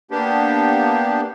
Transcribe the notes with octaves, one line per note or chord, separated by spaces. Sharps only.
A#3 B3 D4 G4